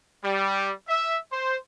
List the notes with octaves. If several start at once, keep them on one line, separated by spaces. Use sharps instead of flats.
G3
E5
C5